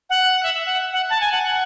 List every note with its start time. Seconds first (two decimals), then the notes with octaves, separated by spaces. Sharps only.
0.10 F#5
0.43 E5
0.54 E5
0.66 F#5
0.93 F#5
1.10 A5
1.21 G#5
1.32 F#5
1.43 F#5